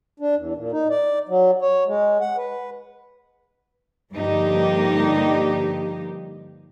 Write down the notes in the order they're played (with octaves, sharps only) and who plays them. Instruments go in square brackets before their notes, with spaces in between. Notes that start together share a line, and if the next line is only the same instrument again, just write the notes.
[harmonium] D4
E2
A#2
D#4
D5
F#3
C#5
G#3
F#5
B4
[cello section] G2 D3 F3 A#3 D#4 G4